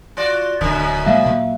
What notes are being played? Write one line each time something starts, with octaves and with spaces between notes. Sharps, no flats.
F4 F#4 D5
D1 F#2 B2 D3
A#2 F#3 G#3 E5 F5
A#2 F#3